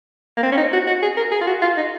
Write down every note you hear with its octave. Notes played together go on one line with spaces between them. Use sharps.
A#3
C4
C#4
D#4
F#4
F#4
G#4
A#4
G#4
F4
F#4
F4
D#4